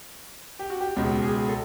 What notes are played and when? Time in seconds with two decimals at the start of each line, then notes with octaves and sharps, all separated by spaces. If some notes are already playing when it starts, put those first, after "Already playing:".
0.59 G4
0.70 F#4
0.81 G4
0.97 C#2 B2 G#3 G4
1.23 G#4
1.48 A4